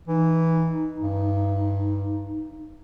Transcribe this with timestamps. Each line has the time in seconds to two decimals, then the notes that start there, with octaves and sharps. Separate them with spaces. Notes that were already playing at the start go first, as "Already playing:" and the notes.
0.08 E3 D#4
1.01 G2